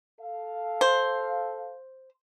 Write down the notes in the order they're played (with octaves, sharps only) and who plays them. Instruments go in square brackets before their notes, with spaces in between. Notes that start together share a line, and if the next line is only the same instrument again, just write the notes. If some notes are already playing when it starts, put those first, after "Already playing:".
[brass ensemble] A4 F5
[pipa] C5